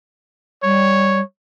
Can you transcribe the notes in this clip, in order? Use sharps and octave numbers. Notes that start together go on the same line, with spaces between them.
G3 C#5